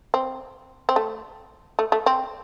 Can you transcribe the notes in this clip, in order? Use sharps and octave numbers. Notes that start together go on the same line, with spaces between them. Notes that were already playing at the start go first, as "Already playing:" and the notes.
C4
C4
A3
A3
A3
C4